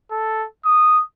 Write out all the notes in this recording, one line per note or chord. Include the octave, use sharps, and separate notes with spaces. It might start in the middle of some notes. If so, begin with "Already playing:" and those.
A4
D#6